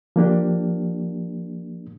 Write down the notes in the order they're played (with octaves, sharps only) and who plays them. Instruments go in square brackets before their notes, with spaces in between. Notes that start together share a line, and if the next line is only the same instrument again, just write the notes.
[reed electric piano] F3 A#3 D4 G4